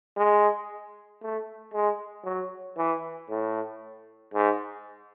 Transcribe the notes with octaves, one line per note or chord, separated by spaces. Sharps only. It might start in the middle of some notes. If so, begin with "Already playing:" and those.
G#3
A3
G#3
F#3
E3
A2
G#2